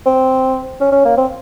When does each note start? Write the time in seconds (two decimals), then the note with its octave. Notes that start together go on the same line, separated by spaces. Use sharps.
0.06 C4
0.81 C#4
0.92 C#4
1.05 A#3
1.18 C4